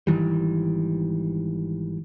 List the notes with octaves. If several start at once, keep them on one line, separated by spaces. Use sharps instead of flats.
G#1 D#3 E3 G3